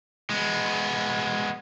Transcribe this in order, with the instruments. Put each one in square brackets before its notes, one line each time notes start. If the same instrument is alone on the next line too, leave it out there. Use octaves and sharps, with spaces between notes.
[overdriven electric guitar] G#3 B3